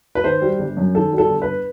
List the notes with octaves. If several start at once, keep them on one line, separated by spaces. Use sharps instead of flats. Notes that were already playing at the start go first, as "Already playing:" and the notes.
B4
D#3 C5
G3
G1
F#2
D#3 A4
G3
A4
G1
B4